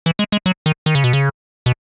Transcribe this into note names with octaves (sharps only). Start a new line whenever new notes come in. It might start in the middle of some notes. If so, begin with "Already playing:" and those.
E3
G#3
G#3
F#3
D#3
D#3
C#3
B2
C#3
B2